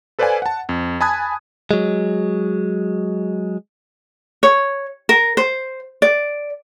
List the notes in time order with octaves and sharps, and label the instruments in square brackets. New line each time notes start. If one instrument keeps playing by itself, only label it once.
[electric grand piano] A4 B4 C5 D5 F5 G#5
F#5 A5
F2
G#5 A5 B5 D#6 F#6 G#6
[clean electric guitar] F#3 G#3
[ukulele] C#5
A#4
C5
D5